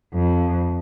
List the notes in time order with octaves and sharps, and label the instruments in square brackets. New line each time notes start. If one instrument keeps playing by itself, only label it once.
[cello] F2